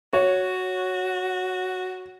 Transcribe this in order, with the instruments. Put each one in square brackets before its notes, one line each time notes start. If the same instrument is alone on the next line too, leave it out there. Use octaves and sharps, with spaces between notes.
[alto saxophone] F#4 [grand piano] C#5